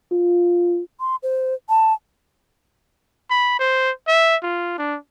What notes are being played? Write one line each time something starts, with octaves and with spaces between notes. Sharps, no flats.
F4
C6
C5
A5
B5
C5
E5
F4
D4